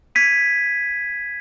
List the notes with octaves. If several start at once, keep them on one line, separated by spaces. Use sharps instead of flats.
G#6 B6 D#7